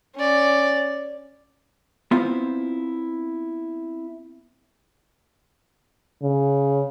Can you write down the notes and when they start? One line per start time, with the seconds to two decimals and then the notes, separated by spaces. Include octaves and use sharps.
0.16 C#4 D5
2.11 B3 C4 E4 F4 C5
6.23 C#3